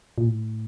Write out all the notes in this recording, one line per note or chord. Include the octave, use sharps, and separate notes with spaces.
A#2
A2